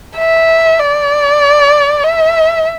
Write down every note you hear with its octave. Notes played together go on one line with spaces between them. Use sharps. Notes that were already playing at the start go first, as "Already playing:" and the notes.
E5
D5
E5